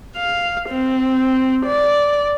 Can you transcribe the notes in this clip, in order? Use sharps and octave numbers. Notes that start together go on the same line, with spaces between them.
F5
C4
D5